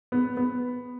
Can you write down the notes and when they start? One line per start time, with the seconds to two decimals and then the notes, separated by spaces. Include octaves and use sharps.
0.12 B3
0.37 B3